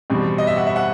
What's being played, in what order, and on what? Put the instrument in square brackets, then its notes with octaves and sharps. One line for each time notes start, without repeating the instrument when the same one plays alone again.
[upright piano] E2 B2 G3 C4
D#5
E5
F#5
E5
F#5